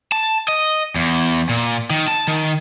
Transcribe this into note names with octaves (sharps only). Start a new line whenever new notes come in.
A5
D#5
E2
A#2
D#3
A5
D#3